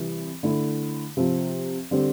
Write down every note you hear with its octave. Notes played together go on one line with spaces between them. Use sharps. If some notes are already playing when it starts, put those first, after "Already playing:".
Already playing: C3 E3 G3
D3 A3 E4
C3 F3 C4
D3 G3 C4